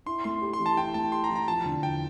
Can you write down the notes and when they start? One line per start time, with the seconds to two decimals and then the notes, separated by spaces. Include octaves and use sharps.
0.06 E4 C6
0.24 A3 C6
0.42 G4
0.54 C6
0.59 E3
0.66 A5
0.77 E4 G5
0.94 A3 A5
1.12 G4 C6
1.24 A#5
1.30 E3
1.36 A#5
1.48 F3 A5
1.66 D3
1.83 E2 G5